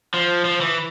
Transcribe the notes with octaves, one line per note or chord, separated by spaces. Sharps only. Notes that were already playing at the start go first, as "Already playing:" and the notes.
F3
F3
E3